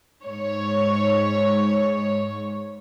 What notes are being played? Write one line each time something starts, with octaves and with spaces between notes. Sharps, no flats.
G#2 C#5